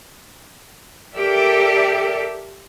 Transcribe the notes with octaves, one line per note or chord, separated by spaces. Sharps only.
G4 A4 A#4 D5 E5